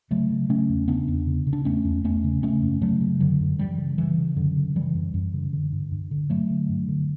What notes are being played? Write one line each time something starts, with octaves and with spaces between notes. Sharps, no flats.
C#3 F#3 A3
C#3
C#3 A3 C#4
E2
C#3 B3 D4
E2
C#3
C#3
D4
E2 A3 C#4
E2
E2 A3 C#4
C#3
C#3 A3 C#4
F#2
C#3 F#3 A3
C#3
F#2 D3 F#3
F#2
F#2 E3 G3
C#3
C#3 E3
C#3
F#2 D3 F#3
C#3
C#3 E3 G3
F#2
F#2
C#3
D3
G2
G2
D3
G2 F#3 A3
D3
G2
D3